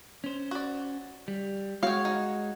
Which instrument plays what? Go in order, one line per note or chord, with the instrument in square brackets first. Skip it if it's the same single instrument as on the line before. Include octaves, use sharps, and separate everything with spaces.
[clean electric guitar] C#4 C5
[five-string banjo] F#4 D5
[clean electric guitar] G3
[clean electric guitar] G#3 [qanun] F#4 C#5 [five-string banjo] F5 G5
[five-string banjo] D#4